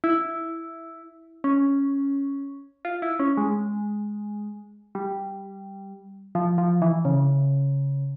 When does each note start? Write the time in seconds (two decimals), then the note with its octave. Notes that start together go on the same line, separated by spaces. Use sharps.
0.04 E4
1.44 C#4
2.85 F4
3.02 E4
3.19 C#4
3.37 G#3
4.95 G3
6.35 F3
6.58 F3
6.82 E3
7.05 C#3